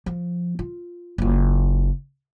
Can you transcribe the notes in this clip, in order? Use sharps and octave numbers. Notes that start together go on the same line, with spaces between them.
F3
F4
F#1 F4